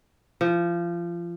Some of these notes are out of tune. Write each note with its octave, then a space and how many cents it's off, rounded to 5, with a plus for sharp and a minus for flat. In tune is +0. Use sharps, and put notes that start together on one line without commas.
F3 -25